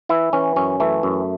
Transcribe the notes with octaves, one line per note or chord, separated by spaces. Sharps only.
E3 E4
E3 C#4
F#2 C#4
E3 A3
F#2